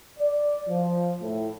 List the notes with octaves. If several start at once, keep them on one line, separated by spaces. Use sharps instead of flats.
D5
F3
A2